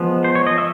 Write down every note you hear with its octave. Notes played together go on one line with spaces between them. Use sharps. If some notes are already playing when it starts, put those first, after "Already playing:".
Already playing: F3 G#3 B3
C5
C#5
D#5
E5